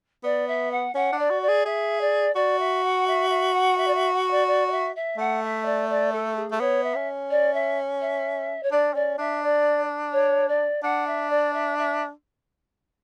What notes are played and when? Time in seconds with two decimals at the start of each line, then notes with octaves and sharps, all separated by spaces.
0.24 B3 D5
0.47 E5
0.71 F#5
0.95 C#4 F#5
1.12 D4
1.18 D5
1.30 F#4
1.42 D5
1.48 G#4
1.65 G#4 E5
2.01 D5
2.35 F#4 D5
2.59 E5
2.83 F#5
3.07 E5
3.29 E5
3.53 F#5
3.77 E5
3.87 D5
3.94 E5
4.12 F#5
4.30 D5
4.47 D5
4.67 D5
4.71 E5
4.95 E5
5.18 A3 F#5
5.42 E5
5.65 D5
5.89 D5
6.12 A4
6.36 G#4
6.52 A3
6.60 B3 C#5
6.83 E5
6.95 C#4
7.30 D5
7.53 E5
8.01 E5
8.63 C#5
8.71 D4 D5
8.94 C#4 D5
9.18 D4 E5
9.42 D5
10.12 C#5
10.48 D5
10.82 D4 F#5
11.06 E5
11.30 D5
11.53 E5
11.78 E5